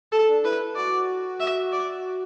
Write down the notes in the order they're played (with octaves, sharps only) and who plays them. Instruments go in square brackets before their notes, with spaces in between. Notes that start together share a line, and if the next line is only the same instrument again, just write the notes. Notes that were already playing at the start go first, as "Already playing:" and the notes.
[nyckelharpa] A4
[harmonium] D4
[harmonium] E4 [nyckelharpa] B4
[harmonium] F#4 [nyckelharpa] D5
[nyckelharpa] E5
D5